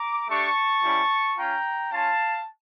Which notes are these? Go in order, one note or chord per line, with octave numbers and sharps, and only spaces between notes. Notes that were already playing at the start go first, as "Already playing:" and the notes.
Already playing: A#5 D6
A3 D4 G4 A5 C#6
G3 C#4 E4
C#4 F4 G5 A#5
C#4 F4 F5 A5